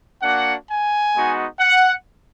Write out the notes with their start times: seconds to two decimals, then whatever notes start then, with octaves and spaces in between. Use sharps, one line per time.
0.22 A#3 D4 F#4 F#5
0.69 G#5
1.14 G#3 B3 D#4 F#4
1.60 F#5